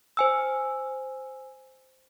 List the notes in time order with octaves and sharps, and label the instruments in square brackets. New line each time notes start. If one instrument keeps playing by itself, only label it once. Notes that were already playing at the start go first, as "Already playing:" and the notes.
[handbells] C5 G#5 E6